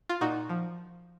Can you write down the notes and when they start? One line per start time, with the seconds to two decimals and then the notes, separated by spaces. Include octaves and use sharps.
0.09 F4
0.21 A#2 D#4 F#4
0.49 F3